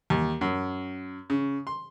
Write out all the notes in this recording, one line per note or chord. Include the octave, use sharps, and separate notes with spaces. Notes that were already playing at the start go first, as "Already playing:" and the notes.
D#2
F#2
C#3
C6